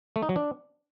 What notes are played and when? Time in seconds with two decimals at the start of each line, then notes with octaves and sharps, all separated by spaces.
0.16 A3
0.22 D#4
0.29 F#3
0.36 D4